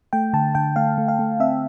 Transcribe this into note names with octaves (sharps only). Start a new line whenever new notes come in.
A3 G5
D3 A5
D3 G5
A3 F5
A3
F5
A3
C4 E5